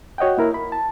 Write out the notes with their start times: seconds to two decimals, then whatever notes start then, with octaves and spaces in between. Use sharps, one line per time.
0.18 F#4 C#5 D#5 F#5 G5
0.38 A#3 E4 A#4
0.54 B5
0.72 A5